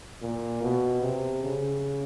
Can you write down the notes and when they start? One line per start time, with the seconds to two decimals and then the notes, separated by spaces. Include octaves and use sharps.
0.22 A#2
0.62 B2
1.02 C3
1.43 C#3